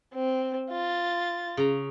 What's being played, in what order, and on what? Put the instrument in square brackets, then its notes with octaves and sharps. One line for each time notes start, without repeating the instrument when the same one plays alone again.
[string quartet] C4
F4 A6
[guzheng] C#3 A#5